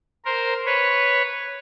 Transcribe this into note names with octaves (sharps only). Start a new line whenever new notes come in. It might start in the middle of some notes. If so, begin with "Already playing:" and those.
A#4 C5
B4 C#5